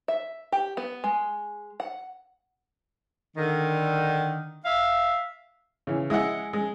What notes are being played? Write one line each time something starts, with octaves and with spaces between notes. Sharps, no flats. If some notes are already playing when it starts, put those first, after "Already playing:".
E5
G4
B3
G#3
F#5
D3 D#3
E5 F5
C#3 E3
G#3 E4 D#5 F#5
G#3